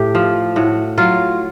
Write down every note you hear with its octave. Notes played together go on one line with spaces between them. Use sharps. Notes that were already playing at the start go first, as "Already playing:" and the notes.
Already playing: A2 G4
F3
A2 F#4
F#3 F4